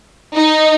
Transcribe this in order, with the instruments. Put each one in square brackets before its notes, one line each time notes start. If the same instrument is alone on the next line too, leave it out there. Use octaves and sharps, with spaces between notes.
[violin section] D#4